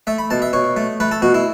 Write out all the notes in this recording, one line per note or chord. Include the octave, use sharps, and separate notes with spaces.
A3 E5
B5
B2 A5
E5
B2 C#5
A3
A3 B4
A4
B2 F#4
E4